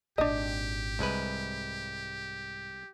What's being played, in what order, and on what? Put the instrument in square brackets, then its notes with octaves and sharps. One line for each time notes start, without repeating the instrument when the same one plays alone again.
[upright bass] G#1 A#2 [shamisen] D4 D#5 [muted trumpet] G4
[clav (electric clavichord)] C2 G#3 B4 [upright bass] G#2